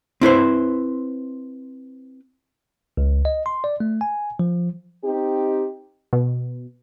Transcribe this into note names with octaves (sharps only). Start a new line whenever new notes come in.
C4 E4 B4 C5
C#2
D#5
C6
D5
A3
G#5
F3
C4 D#4 G4
B2